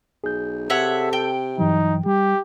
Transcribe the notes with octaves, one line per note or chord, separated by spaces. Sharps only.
B1 G#4 G6
C3 A4 C#5 E5 F#5
G5
G2 E3 F#3 D#4
G3 G4